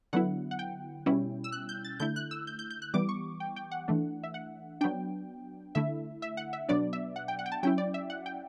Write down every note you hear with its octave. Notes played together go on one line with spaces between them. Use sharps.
D3 F#3 B3 E4 F#5
F#5
G5
B2 G3 C#4 E4
E6
F#6
G6
A6
D3 A3 E4 G6
F#6
E6
G6
G6
G6
F#6
E3 G3 B3 D6
C#6
G5
G5
F#5
E3 A3 D4
E5
F#5
F#3 B3 D4 G5
D3 A3 E4 E5
E5
F#5
E5
B2 F#3 B3 D4 D5
E5
F#5
G5
F#5
G5
A5
F#3 C#4 E4 G5
D5
E5
F#5
G5